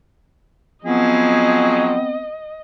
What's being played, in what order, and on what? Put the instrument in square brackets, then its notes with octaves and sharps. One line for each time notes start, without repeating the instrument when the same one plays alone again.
[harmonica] F3 F#3 G#4 [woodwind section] B3 C4 [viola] D#5